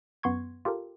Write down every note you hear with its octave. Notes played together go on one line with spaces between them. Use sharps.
F#2 B3 C6 C#6 G#6
F4 G4 A4 A#4